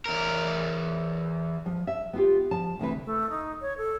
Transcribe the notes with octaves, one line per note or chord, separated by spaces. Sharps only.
E2 A#4
F3
E5
B3 F4 G4
F3 A5
D2 C3 E3 B4
A3
D#4
C#5
A4